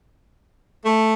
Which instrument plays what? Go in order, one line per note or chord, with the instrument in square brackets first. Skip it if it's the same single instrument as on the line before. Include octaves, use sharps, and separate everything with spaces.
[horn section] A3